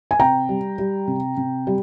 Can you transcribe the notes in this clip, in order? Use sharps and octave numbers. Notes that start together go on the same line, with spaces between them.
G#5
C3 G5 A#5
G3
G3
C3
C3
G3